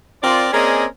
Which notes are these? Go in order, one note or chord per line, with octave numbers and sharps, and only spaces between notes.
C4 F4 A#4 D5
A#3 C4 C#4 G#4 D5 D#5